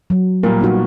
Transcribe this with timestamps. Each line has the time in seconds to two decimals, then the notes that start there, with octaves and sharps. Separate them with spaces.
0.10 F#3
0.43 A#2 G3 A#4
0.60 B3 D#4 F#4